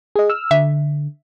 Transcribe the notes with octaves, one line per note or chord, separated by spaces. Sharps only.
G#4 D#5
E6 F6
D3 E5